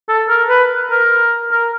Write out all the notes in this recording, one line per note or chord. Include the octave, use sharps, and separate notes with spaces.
A4
A#4
B4
A#4
A#4